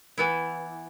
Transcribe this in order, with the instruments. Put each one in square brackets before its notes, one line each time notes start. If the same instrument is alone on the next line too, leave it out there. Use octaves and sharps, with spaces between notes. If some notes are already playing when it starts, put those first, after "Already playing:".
[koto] E3 B3 E4